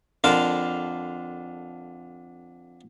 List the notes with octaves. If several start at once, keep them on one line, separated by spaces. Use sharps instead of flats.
F2 D3 D4 F4 A#4 A5